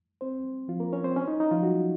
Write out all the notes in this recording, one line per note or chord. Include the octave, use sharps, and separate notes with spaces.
C4 C5
F3 F4
A#3 A#4
C#4 C#5
C4 C5
C#4
D#4
D#4
F3 F4
F#3 F#4